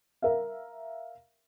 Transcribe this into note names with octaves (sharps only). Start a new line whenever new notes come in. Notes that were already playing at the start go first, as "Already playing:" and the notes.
A#4 E5 F5